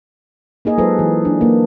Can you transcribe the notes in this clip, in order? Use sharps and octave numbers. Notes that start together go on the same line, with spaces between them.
A#3 D#4 G#4 D#5
F#3 G#3 F4 A4 B4 C5
E3
D4
A#3